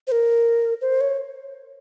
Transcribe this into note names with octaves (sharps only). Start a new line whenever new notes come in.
C5
A#4
C5
C#5